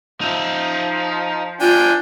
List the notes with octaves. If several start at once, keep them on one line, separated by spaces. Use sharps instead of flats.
F3 D#4 E5
D4 F4 G5 G#5